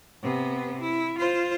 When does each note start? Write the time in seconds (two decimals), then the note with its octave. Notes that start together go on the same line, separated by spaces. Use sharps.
0.23 C3 B3
0.81 E4
1.18 F4 C5